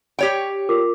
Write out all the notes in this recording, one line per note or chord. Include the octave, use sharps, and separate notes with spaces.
G4 C#5 G5
F4 A#4 D6